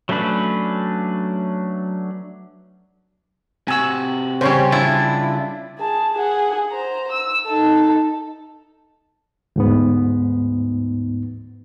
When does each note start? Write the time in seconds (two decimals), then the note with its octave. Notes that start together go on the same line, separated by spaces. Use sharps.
0.09 F#3 A3 C#4 D4 B4
3.68 C3 F#4 G#5 E6
4.41 C#3 G3 C5 C#5
4.72 D4 E4 F4
5.79 G#4 A5
6.13 G#4 F#5
6.71 C5 A#5
7.11 E6
7.47 D#4 A4
9.56 D2 G#2 B3